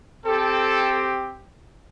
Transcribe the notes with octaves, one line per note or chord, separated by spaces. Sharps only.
C4 G4 A4